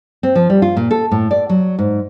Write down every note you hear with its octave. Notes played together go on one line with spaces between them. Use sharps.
C4
F3
G3
F4
A#2
A4
A2
D5
F#3
G#2